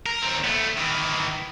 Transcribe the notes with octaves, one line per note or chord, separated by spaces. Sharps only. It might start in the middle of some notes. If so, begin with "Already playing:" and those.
A#4
D#2 C4
A3 B3
D#3 E3